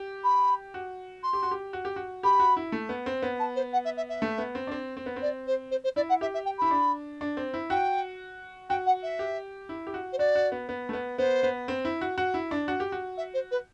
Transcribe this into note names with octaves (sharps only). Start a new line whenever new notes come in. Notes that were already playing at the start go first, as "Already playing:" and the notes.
Already playing: G4
B5
F#4
C6
G4
F#4
G4
F#4
G4
F#4
G4 B5
F#4
E4
A3
B3
C4
B3
A5
C5
F#5
E5
E5
E5
A3
B3
C4
D4
C4
C4
B3
C4
D5
C5
C5
C5
E4 D5
F#5
G4 E5
E5
G5
E4 B5
D4
D4
C4
E4
F#4 G5
F#4 G5
F#5
E5
G4
E4
G4
F#4
C5
F#4 D5
F#4
B3
B3
A3
B3
B3 C5
B3
C4
E4
F#4
F#4
E4
D4
F#4
G4
F#4
E5
C5
B4